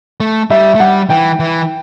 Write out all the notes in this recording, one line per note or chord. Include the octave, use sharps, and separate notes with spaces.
A3
G3 E5
A3
G3 F#5
E3 G5
E3